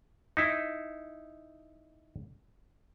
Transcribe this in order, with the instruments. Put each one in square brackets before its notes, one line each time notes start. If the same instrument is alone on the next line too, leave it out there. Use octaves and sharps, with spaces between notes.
[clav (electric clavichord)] D#4 E4